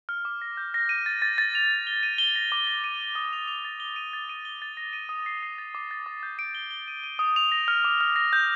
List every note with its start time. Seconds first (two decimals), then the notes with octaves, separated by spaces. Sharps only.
0.09 F6
0.25 D6
0.42 A#6
0.57 G6
0.74 A#6
0.89 D#7
1.06 A6
1.22 A6
1.38 A6
1.55 F7
1.71 F7
1.87 G7
2.03 D#7
2.18 G7
2.36 A#6
2.52 D6
2.67 A#6
2.84 D#7
3.00 D#7
3.15 D#6
3.33 F7
3.48 F7
3.65 A6
3.80 G7
3.96 D#7
4.13 A6
4.29 D#7
4.45 G7
4.62 A6
4.77 A#6
4.93 D#7
5.09 D#6
5.26 C7
5.43 C7
5.58 A6
5.75 D6
5.91 A6
6.06 D6
6.23 G6
6.39 D7
6.55 G7
6.71 G7
6.88 D#7
7.04 D#7
7.19 D#6
7.36 F7
7.52 A#6
7.68 F6
7.84 D6
8.01 F6
8.16 A#6
8.33 G6